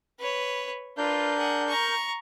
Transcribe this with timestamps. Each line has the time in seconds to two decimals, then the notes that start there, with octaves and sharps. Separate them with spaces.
0.20 B4 C#5
0.98 D4 F4 A#4 B4 G6
1.38 G#4 F#5
1.67 A#5 C#6